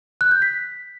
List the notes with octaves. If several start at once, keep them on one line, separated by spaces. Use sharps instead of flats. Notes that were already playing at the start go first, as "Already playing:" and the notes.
F#6
G6
B6